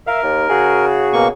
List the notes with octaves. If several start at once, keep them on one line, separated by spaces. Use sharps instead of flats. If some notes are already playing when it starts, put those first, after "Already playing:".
A#4 E5 F5
D#2
C#3 F#4 G#4
B2 A#3 C#6